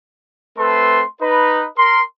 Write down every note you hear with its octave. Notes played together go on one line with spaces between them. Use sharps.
A3 C4 A4 B4 C6
D#4 B4
A#4 C6